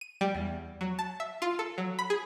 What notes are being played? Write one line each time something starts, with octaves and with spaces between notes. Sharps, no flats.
D#7
G3
E2
F#3
A5
E5
F4
A4
F#3
B5
G#4